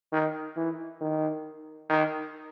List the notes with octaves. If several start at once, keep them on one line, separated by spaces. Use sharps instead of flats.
D#3
E3
D#3
D#3